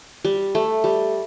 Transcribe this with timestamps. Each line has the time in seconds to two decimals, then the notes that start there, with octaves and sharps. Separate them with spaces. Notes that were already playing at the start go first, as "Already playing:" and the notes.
0.25 G3
0.55 A3
0.84 G3